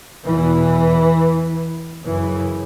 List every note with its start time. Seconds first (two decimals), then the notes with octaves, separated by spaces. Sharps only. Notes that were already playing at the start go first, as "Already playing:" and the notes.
0.25 E2 B2 E3
2.03 F#2 C#3 E3